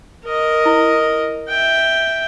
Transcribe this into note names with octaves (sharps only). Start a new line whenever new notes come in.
A#4 D#5
E4
E5 G5